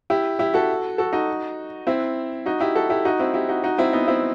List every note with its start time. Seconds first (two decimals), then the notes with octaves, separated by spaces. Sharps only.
0.10 E4 G4
0.39 E4 G4
0.54 F#4 A4
0.98 F#4 A4
1.13 D#4 F#4
1.87 C4 E4
2.46 D#4 F#4
2.60 E4 G4
2.75 F#4 A4
2.90 E4 G4
3.05 D#4 F#4
3.19 C4 E4
3.34 E4 G4
3.49 D#4 F#4
3.63 D#4 F#4
3.78 C4 E4
3.93 B3 D#4
4.08 C4 E4